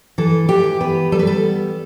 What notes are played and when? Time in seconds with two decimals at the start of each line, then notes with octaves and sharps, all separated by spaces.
0.18 E3 A4
0.49 E3 G4
0.80 B3 B4
1.12 G3 A4
1.19 B4
1.27 A4
1.43 B3